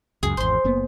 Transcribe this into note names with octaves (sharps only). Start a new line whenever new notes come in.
C#2 F#2 G#4
G#1 E2 C5 C6
F#1 A#3 B3